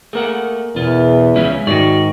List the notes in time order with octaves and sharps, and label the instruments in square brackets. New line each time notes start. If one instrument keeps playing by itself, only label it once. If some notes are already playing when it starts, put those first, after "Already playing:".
[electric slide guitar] A3 A#3 F#5 [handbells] G#4 A#4
[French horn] E2 [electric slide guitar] B2 F4
[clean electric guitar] C#2 [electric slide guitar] C#3 F3 C#4 [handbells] E5
[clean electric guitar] G#2 D#3 [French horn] F#4 [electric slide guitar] D5 [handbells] C#6 A#6